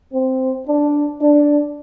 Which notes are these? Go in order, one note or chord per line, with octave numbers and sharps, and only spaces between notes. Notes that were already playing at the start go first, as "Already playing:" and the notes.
C4
D4
D4